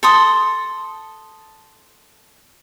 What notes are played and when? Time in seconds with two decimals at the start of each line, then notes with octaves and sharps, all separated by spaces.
0.03 A4 C6 D#6